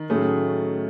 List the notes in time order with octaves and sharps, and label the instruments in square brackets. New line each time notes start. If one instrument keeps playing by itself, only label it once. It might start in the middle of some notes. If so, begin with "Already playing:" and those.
Already playing: [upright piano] D#3
[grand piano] A2 F#3 C#4 G#4 [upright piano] A3